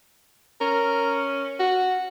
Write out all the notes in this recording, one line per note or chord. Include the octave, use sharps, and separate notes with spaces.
C#4 A#4
F#4